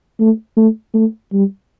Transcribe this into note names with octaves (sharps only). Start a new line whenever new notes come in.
A3
A3
A3
G3